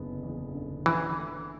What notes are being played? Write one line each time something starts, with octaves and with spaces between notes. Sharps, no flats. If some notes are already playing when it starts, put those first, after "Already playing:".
Already playing: F#1 D3 B3
E2
D3
D3 E3
A3